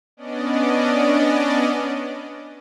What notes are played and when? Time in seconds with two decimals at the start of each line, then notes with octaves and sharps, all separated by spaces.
0.17 B3 C#4 D4 D5 D#5